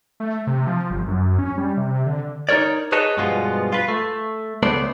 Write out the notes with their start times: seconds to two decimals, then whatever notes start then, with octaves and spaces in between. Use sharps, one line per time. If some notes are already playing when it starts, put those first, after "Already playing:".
0.20 A3
0.47 C3
0.67 F3
0.90 G1
1.08 F#2
1.39 C#4
1.58 G3
1.77 C3
2.06 D3
2.49 D#4 F#4 A#4 C#5 D5
2.92 G#4 B4 C#5 D#5 A5
3.17 G2 B2 F3 G#3 B3 F4
3.72 F4 B4
3.88 A3
4.63 C#2 A3 B3 C5 D5